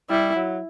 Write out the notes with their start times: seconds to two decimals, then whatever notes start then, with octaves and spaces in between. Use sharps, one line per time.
0.10 G3 E4
0.36 F#3